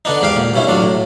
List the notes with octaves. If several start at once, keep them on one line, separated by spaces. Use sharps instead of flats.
D3 B3 D4 D#4
E2 G#2 G4 F5 D6
A#2
G2 B2 C#4 E4
A1 F#3 D4 F4
A2